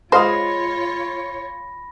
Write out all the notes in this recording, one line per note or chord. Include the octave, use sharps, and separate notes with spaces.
G#3 F4 C5 C#5 F5 B5 D#6 A#6